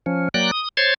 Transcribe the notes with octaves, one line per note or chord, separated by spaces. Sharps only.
F3 C#4
F#3 A#3 D5 G5 F#6
D#6
C5 C#5 C6 G#6 A6